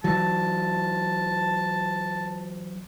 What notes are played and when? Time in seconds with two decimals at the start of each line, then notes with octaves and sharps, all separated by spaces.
0.04 E3 F#3 A5